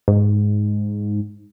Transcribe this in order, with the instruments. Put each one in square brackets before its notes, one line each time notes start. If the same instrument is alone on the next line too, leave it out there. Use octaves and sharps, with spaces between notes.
[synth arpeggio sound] G#2